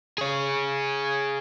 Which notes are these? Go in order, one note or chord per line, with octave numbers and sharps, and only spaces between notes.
G#4 C#5